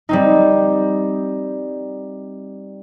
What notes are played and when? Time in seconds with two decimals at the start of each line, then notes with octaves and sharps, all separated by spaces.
0.09 G3 C4 D#4